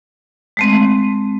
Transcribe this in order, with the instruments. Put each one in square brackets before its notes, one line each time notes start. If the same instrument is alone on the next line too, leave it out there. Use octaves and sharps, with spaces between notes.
[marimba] G#3 A3 C4